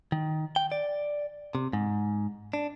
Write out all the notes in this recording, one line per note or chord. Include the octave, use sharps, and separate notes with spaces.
D#3
G5
D5
C3
G#2
D4